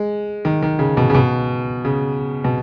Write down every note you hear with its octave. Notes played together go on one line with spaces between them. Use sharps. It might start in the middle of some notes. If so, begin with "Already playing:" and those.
Already playing: G#3
D#3
D#3
C#3
B2
C#3
B2
C#3
B2